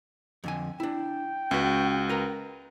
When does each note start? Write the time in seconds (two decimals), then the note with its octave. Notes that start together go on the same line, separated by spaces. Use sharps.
0.44 F2 D3 G#5
0.80 D4 E4 G5
1.51 C#2 C#4 F#4 B4
2.09 A#4 B4